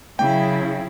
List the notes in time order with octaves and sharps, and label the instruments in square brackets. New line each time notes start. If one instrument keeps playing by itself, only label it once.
[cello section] C#3 F#3 E4 [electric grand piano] G5